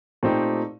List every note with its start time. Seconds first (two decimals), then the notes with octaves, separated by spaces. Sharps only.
0.23 A#2 A3 C4 D#4 G4